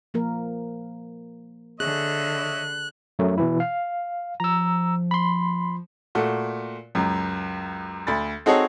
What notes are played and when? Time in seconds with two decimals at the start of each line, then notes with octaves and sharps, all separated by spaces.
0.14 F3 A#3 A#4
1.80 D3 G#4 C#5 D#5 E5 F#6
3.19 F#2 F#3 A3
3.38 B2 E3 E4
3.60 F5
4.40 F3 A#5 E6
5.11 B5 C6
6.15 A#2 A3 F#4
6.95 C#2 F#2
8.07 D2 B5 A6
8.46 C4 D#4 F#4 G#4 A4 C#5